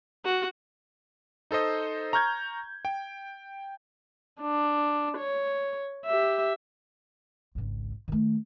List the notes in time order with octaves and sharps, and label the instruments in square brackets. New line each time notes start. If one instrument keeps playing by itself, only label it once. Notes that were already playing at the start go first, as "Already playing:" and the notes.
[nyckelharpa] F#4
[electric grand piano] D#4 A4 C5 D#5
A#5 C#6 F6 G6 G#6
G5
[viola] D4
C#5
G4 E5
[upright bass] G#1 C#2
D#3 A3